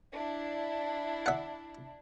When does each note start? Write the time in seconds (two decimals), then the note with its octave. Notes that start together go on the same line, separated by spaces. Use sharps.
0.13 D4 E4
1.26 E5 F#5